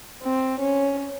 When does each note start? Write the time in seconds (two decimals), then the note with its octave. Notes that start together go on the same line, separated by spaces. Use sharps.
0.23 C4
0.60 C#4